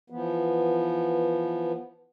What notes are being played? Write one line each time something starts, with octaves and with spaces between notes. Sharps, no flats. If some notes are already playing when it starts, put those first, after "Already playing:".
E3 F3 B3